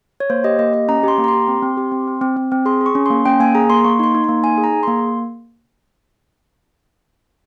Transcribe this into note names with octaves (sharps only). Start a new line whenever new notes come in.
C#5
A#3 C5
G4 D#5
A#3 D#5
G4 D#5
C#4 A#5
G4 C6
A#3
A#5
C6
G4
C4
C4
G4
C4
C4
C4
C4
C4
G#4 C6
G#4 C#6
C#4
A#3 C6
C#4 G5
A#3 G#5
G#4 A#5
A#3 C6
A#3 C#6
D#4 C6
D#4
A#3 C6
D#4 G#5
G#4
A#5
G#4
A#3 C6